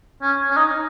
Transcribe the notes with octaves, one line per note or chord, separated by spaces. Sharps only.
C#4
C#4
D#4